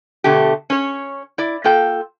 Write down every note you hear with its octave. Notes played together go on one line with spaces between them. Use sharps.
B2 D3 A3 G4
C#4 C#5
E4 D5
A#3 F4 A4 G5